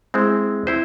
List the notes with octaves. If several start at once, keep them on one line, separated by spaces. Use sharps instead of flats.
G#3 C4 E4 C5
C4 E4 C5